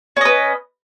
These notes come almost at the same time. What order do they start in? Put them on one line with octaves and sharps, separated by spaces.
C#4 D#5 B4